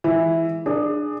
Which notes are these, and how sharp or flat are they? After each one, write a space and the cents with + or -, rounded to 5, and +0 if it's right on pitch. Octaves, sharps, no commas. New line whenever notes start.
E3 +0 G#3 +0 E4 +0
D4 +20 G#4 +0